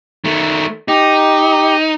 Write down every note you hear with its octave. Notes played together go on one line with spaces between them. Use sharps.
D#3 A3
D#4 G4